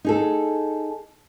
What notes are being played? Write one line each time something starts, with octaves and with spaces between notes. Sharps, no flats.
D#4 G#4 A4